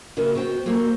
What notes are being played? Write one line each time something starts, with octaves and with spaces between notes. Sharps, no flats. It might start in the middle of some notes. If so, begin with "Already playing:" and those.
C#3 A#3 B3 F#4 A#4 E5
B3 F#4 C5 G5
A#3 F#4 A4 C5